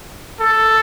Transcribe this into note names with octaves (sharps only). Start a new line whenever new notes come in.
A4